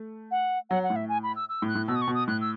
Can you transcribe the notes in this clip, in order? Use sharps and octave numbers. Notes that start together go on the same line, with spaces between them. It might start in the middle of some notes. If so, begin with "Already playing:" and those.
Already playing: A3
F#5
F#3 F#5
F#5
A2
E5
G#5
B5
E6
E6
A2
F#6
A2
B2 E6
D#6
C#6
B2
D#6
A2 F#6
E6